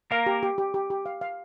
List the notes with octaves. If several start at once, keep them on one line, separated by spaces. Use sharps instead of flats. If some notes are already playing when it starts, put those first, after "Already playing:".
A#3 A#4 F5
G4
G4
G4
G4
G4
F5
F5